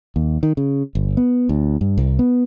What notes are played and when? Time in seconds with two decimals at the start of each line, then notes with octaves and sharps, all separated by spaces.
0.16 D#2
0.43 D#3
0.57 C#3
0.95 G1
1.17 B3
1.49 D2
1.81 G2
1.98 C2
2.19 B3